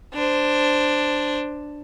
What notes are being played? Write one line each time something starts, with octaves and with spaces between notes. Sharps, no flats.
D4 C5